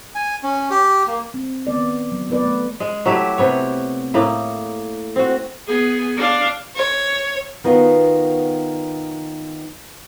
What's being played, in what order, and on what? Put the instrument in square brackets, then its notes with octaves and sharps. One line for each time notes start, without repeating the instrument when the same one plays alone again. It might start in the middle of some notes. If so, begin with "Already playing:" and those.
[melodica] G#5
C#4
G4
A#3
[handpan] C4
D#3 B3 D5
F#3
B3 B4 D5
A3
[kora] G#3
F#3 A3 E4 G4
C3 B3 C#5
A2 A#3 E4
C4 F#4
[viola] B3 G#4
D4 F5
[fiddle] C#5
[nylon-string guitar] D#3 B3 F4 F#4